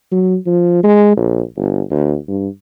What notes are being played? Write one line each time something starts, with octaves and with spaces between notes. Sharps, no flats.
F#3
F3
G#3
A#1
G1
D2
G2